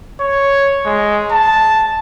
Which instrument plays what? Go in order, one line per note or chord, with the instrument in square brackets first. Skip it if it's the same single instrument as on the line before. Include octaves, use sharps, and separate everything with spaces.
[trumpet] C#5
G#3
A5